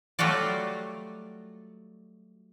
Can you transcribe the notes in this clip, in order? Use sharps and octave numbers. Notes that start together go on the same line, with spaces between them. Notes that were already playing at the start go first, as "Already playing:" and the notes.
F#3 G3 A3 F4 F#4 D5